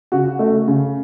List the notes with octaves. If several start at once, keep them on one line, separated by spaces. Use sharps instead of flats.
C#3 F#4
A3
C#3